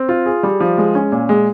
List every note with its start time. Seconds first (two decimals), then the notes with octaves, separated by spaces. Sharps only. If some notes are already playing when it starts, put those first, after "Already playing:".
Already playing: C4
0.09 F4
0.26 G#4
0.43 G3
0.60 F3
0.78 G#3
0.95 C#4
1.12 A#2
1.29 G#3